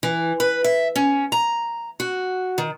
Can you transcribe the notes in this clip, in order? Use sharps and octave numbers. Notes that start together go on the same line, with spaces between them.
E3
B4
E5
C#4
A#5
F#4
D#3